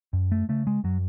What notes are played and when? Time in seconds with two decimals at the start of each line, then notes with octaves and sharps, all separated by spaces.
0.13 F#2
0.32 A3
0.49 C#3 A3
0.67 G#3
0.84 F#2 F#3